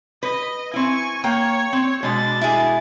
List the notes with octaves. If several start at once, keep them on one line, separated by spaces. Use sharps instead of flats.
B4 D#5
C4 E4 G#5 C#6
A#3 C#5 G5
C4
B2 G#3 D4 A6
E4 G#4